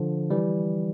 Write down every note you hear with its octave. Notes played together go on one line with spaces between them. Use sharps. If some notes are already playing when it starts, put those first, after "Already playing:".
Already playing: D3 F3
E3 G3